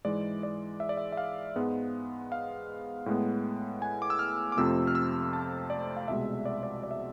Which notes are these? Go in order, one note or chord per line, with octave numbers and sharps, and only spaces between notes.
G#2 E3 G#3 D5
D5
E5
D5
E5
E5
F5
G#2 G#3 B3
F5
A2 G#3 B3
G#5
D6
E6
F6
D6
F2 C3 F3 A3 E6
F6
E6
A5
D5
F5
C2 B2 G#3 E5
D5
D5
D5
E5